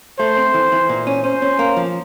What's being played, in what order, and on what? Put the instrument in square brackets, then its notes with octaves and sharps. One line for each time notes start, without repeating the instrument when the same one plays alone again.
[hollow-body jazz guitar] A3 [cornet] C5
[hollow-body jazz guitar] C4
E3
E3
A#2
C#4
[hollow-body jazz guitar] C#4 [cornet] C5
[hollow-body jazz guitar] C#4
A#3
F3